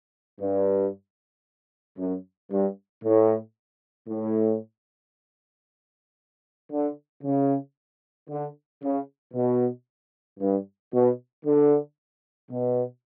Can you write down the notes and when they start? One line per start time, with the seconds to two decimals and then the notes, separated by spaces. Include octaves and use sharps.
0.40 G2
1.98 F#2
2.50 G2
3.03 A2
4.08 A2
6.71 D3
7.23 C#3
8.29 D3
8.82 C#3
9.34 B2
10.40 G2
10.93 B2
11.44 D3
12.50 B2